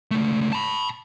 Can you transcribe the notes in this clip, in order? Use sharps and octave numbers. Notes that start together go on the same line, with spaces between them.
C#2 A3
A5 B5